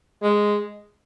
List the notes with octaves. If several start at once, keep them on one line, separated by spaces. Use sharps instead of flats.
G#3